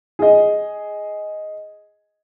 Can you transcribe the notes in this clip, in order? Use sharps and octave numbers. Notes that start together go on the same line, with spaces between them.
G#4 D#5